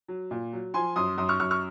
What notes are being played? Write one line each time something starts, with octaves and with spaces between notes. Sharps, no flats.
F#3
A#2
F#3
F3 G#5 C6
F#2 C6 D#6
F#2 C6 D#6
C#6 F6
F#2 C#6 F6
C#6 F6